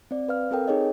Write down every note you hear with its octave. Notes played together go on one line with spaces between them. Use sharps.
C4 D5
B4 F5 F6
C4 A4 A#4 G5
D#4 G#4 C#5 D#5